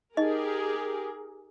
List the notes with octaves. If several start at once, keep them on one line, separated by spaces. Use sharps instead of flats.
D#4 G4 G#4 A#4 D#5